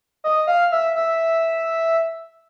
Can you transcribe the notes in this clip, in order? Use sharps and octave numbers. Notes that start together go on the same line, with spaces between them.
D#5
F5
E5
E5